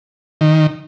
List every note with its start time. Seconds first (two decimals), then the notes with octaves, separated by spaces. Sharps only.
0.41 D#3